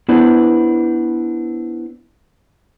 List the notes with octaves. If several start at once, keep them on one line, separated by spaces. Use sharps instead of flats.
B3 D4 E4 B4 C5 D5